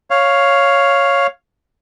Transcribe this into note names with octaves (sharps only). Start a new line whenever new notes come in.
C#5 F5